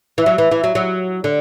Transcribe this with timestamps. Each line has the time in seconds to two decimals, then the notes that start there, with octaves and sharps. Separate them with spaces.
0.18 E3
0.26 F#3
0.38 E3
0.51 E3
0.64 F#3
0.75 F#3
1.24 D3